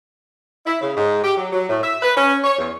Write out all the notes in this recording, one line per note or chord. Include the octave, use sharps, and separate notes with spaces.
E4
C#3
G#2
G4
F#3
F#3
A2
E5
B4
C#4
C#5
E2